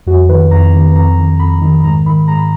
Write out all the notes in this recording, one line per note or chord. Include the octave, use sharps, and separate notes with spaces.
F2 F#4
D#3 B4
F2 A#5
D#3
F2 A#5
D#3
F2 B5
D#3
G#2 A#5
D#3 B5
G#2 A#5
B5